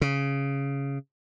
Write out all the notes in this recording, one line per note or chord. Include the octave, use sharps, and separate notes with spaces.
C#3